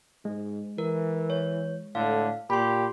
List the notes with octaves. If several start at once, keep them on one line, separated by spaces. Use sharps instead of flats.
G#2 G#3
E3 A#4
C#5
A2 D3 F5
A#2 G4 B5 C6